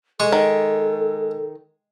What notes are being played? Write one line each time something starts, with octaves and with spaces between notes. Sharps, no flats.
G#3 A4 C#6
D#3